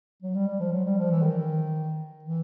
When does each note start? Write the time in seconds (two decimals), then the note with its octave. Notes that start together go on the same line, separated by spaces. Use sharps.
0.22 F#3
0.34 G3
0.47 G3
0.60 F3
0.72 F#3
0.85 G3
0.98 F3
1.11 E3
1.22 D#3
2.23 E3